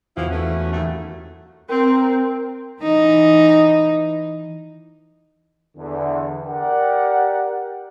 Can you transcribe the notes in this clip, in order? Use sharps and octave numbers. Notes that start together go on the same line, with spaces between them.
E2 E3 F3 E4 F#4
A3 C#4
D#2 F#3 A3
C4 A#4 G5
E3 D#4
E2 D3
G4 A#4 D5 F#5